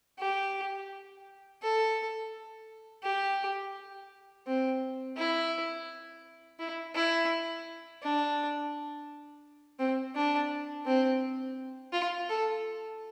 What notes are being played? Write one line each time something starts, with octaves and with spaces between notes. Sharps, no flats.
G4
A4
G4
C4
E4
E4
E4
D4
C4
D4
C4
F4
A4